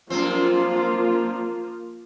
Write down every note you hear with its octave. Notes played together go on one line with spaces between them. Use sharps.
F#2 F3 A#3 C4 F4